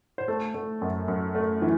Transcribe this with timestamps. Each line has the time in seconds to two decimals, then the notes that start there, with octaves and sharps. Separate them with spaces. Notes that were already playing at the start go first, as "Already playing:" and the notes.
0.18 C5
0.28 A3 A4
0.54 A3
0.82 F#2
1.08 F#2
1.35 A3
1.62 E3